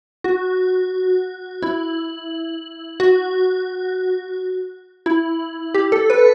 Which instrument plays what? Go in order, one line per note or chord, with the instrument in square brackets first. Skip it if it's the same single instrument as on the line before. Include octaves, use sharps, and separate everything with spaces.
[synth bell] F#4
E4
F#4
E4
G4
A4
B4